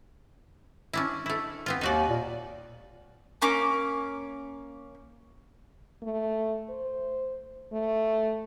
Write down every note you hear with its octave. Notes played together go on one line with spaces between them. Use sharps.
C#4 D4 E4
A3 E4
B3 C4 F4
D#2 D#4 F#4 D5
A#2
A#3 C#4 D6
A3
C5
A3